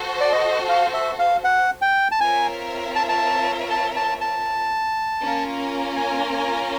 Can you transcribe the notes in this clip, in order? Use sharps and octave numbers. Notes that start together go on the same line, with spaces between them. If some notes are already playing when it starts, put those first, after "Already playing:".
Already playing: F#4 A4 C5
D5
D#5
F5
E5
F5
F#5
G5
A5
C4 F4 A#4 C#5 E5 G#5
A5
A5
A5
A5
A5
A#3 C#4 F4 A#4
G#5
G#5